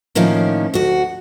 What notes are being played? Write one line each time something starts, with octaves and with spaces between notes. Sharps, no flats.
A2 D#3 F3 A#3 C#4
D2 F#4